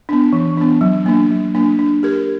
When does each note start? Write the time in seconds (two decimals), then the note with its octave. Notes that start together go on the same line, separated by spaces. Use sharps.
0.09 B3 D4
0.33 E3
0.57 B3 D4
0.81 F#3
1.06 A#3 D4
1.30 F#3
1.55 A#3 D4
1.79 D4
2.03 G4 A#4